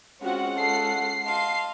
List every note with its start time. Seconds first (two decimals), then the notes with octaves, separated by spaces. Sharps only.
0.22 G#3 C4 C#4 F4 F#4 F#5
0.57 A4 C7
1.25 D#5 F5 A5 C6